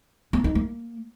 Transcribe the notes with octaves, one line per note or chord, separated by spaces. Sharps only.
B3
D#4
A#3